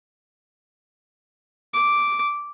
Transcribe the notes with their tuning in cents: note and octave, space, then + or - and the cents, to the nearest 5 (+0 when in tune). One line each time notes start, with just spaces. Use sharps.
D6 -5